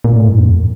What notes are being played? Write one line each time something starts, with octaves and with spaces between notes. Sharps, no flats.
A#2
A2
G2
F2